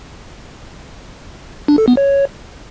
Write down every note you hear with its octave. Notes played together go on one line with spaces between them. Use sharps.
D4
A4
B3
C#5